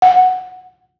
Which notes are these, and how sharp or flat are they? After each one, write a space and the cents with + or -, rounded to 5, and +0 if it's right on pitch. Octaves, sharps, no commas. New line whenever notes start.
F#5 -5